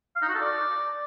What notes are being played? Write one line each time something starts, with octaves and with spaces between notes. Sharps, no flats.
F5
D#4
F#4
A4
D5